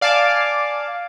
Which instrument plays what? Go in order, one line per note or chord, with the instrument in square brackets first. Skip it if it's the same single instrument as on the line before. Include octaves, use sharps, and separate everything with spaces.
[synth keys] D5 F5 G#5 A5 D6